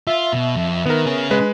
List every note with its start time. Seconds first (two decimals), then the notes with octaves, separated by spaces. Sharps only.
0.07 F4 E5
0.33 B2
0.55 F2
0.86 D#3 B3 A#4
1.05 C#4 G#4
1.31 G#3 B4